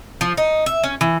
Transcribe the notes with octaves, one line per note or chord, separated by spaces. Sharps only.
F3
D#4
E5
C#4
E3